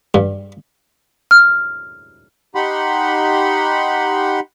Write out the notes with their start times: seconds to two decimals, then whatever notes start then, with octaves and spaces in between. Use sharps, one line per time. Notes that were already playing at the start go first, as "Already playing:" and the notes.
0.14 G2
1.31 F6
2.55 D#4 G4 F#5 B5 C6